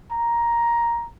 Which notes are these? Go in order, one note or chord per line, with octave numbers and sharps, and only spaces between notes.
A#5